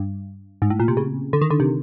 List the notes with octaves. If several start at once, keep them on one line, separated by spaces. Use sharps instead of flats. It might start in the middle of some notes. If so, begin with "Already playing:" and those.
Already playing: G2
G#2
A2
A#2
C3
C#3
D3
D#3
D3
C3